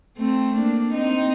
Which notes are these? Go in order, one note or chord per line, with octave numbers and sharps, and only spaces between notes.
A3 C4
A#3 D4
C4 D#4